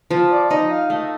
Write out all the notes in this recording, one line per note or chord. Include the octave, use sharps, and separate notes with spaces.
F3
D5
D5
D#4 D#5
F5
A3 D#5